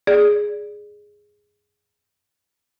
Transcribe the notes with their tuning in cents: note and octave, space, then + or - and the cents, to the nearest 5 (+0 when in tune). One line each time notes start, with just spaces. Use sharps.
G#4 +0 D5 +0